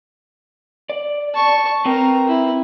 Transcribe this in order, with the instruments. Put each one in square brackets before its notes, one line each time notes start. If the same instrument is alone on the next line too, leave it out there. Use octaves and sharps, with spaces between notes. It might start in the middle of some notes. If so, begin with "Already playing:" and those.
[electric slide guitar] D5
[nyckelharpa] A5 C#6
[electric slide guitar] C4 B4 G5 [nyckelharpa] A#4 A#5
[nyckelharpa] E4